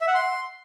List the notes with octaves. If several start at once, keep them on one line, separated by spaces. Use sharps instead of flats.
E5
F#5
C6